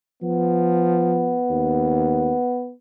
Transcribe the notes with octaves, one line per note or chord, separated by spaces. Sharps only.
F3 B3
D#2